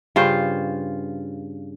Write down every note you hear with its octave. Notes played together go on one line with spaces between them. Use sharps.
G2 C#3 F4 C5